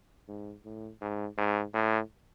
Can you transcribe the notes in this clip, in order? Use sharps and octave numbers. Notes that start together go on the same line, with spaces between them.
G#2
A2
G#2
G#2
A2